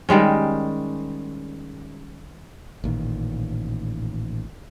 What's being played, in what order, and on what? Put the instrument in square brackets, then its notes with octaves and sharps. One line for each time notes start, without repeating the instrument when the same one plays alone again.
[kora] D#3 G3 G#3 C#4
[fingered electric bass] A1 A#2 D#3